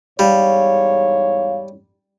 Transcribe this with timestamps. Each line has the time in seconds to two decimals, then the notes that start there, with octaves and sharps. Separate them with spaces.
0.19 E2 G#2 G3 C#5 F5